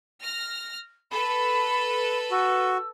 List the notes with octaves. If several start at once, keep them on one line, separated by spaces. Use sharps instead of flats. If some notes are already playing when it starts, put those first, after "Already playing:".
F6 A#6
A4 B4 B5
F#4 E6